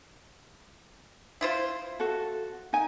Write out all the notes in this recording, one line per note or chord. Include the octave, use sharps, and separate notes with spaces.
E4 F4 C5
F#4 A4
D#4 G#5